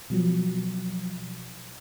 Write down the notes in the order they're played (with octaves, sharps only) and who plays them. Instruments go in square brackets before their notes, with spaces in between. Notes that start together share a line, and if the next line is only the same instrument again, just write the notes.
[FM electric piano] B2 F3 F#3